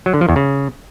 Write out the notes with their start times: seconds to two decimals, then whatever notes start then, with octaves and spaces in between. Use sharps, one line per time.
0.06 F#3
0.14 D3
0.21 F3
0.29 E2
0.36 C#3